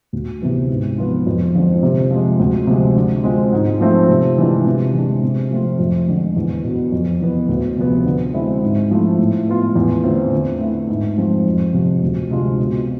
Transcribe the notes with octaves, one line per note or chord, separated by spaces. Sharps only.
D2
C3 E3 B3
G#2
F3 B3 F4
F2
D3 F3 G#3 C4
C3
F3 G#3
D2
C3 F3 G#3
D3
G#3 C4 F4
G#2
F3 A3 C4 F4
C3
E3 G#3 D4 F4
C3
E3 G#3 D4
C3
F3 A3 C4 F4
F2
D3 G#3
E2
B2 B3
F2
E3 B3
D2
C3 F3 B3
D3
G#3 C4 E4
G#2
F3 A3 E4
A2
G#3 B3 F4
E2
D3 A3 C4 F4
D3
A3 E4
G#2
F3 G#3 C4
F2
C3 F3
D2
C3 G#3 D4 F4
B2